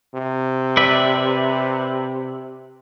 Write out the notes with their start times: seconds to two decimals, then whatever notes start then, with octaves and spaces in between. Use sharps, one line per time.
0.15 C3
0.77 B4 D5 E5